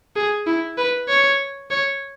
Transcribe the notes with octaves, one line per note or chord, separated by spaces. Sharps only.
G#4
E4
B4
C#5
C#5